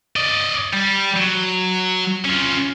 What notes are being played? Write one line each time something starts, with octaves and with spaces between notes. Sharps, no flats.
D5 D#5
G3
F#3
C#4 F4